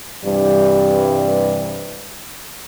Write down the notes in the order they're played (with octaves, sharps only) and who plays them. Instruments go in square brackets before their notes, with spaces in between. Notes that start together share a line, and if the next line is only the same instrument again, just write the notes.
[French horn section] G2 C3 E3 G3